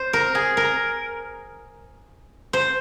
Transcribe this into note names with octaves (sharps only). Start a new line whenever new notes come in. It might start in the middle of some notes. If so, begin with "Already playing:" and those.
Already playing: C5
A#4
G#4
A#4
C5